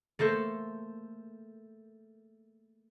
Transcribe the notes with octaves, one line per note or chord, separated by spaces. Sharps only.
A3 A#3 A4 C5